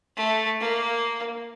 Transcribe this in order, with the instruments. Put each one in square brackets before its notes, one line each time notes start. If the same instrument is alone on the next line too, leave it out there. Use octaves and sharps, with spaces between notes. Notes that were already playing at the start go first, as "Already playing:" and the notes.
[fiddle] A3
A#3